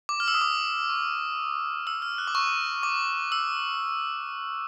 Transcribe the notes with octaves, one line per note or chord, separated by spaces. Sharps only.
D6
F6
E6
D#6
D6
C#6
E6
F6
F#6
D6
C#6
D6
E6